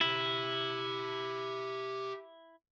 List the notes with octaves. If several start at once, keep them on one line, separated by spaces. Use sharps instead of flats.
E4 G4 E5